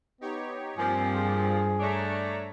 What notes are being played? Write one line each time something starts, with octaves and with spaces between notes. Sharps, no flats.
B3 D#4 G4 C#5
G2 A#2 F3 C4 G4 G#5
G#4
A3 D4 C#5 A#5